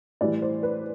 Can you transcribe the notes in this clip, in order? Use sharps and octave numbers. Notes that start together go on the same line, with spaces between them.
A2 E3 G3 D5
C5
B4